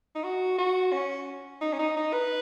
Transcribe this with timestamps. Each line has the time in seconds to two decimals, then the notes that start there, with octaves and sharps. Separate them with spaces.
0.15 D#4
0.24 F#4
0.58 F#4
0.93 C#4
1.61 D#4
1.73 C#4
1.79 D#4
1.96 D#4
2.13 B4